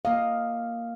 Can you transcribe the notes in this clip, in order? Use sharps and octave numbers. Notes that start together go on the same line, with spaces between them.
A#3 D#5 F5